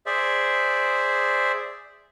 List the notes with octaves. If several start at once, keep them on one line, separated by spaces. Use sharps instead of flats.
G#4 C5 D5 E5